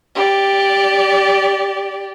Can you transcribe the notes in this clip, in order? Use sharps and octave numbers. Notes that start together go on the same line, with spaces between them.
G4 D5